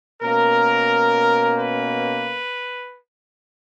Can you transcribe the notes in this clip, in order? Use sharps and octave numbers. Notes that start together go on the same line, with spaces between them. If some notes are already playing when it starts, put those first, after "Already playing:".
B2 A#3 C#4 A#4
B4